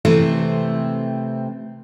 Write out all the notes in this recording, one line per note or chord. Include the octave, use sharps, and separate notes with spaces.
C3 E3 A3 C4